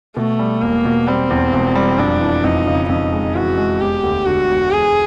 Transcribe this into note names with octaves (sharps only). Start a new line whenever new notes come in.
B2 A3
G3
E1 A#3
B2
G3 C4
E2
E1
G3
F2 D4
E3
F2 D#4
C#3
F2 D#4
G#3
E3 F#4
G#3
E1 G4
D2
D3 F#4
E1
E1 G#4